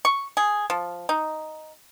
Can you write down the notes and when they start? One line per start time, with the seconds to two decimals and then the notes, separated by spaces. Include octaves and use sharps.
0.05 C#6
0.37 G#4
0.70 F3
1.09 D#4